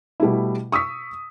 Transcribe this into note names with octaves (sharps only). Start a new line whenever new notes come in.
B2 G3 A3 E4
C#6 D#6 E6 B6